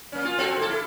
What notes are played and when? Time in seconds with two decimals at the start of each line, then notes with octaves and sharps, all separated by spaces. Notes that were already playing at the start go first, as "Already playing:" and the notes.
0.12 A#3 C#4
0.25 F4
0.38 C4 F#4 A4
0.57 A#3 E4 A4
0.70 E4